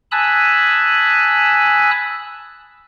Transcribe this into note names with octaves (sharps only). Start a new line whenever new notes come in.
G#5 A5 B5 D#6 E6 F#6